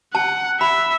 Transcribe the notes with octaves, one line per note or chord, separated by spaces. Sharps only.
F#5 A5
E5 B5